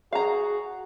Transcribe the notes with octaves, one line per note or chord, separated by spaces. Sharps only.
F#4 G#4 F5 A#5